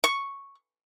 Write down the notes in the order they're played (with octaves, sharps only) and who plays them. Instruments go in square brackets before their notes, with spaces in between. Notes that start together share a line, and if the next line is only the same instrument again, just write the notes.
[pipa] C#6